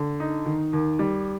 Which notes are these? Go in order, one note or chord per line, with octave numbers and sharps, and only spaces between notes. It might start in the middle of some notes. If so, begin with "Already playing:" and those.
Already playing: D3
D#4
D#3
D#2
G3